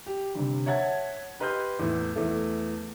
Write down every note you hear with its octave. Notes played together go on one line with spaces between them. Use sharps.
G4
G1 C3
C#5 E5 F#5 A5 G#6
G4 B4 D#5 C6 F6 G6
E2 A2
E2 A3